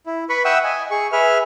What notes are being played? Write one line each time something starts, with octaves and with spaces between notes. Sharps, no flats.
E4
B4 B5 C#6
E5 F#5 G5 C#6 D#6 E6
D#5 G#5
G#4 C#6
G#4 B4 E5 F6